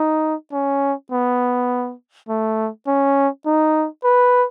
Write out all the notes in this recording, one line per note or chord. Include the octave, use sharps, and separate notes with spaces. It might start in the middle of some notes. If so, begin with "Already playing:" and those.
Already playing: D#4
C#4
B3
A3
C#4
D#4
B4